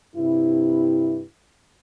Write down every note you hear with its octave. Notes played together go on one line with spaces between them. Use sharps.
G2 C3 E4